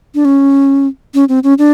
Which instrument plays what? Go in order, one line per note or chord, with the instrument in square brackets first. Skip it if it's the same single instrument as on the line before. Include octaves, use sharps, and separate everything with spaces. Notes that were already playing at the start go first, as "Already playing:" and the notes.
[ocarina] D4
C#4
C#4
C4
C#4
D4